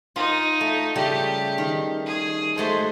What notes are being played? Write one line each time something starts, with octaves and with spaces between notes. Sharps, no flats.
D#4 F4
A3
C#3 G3 A3 G4
D#3
G#4
G#3 A3 F#4 C5